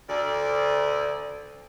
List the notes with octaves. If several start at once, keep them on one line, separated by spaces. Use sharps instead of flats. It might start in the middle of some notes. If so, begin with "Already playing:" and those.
D2 D5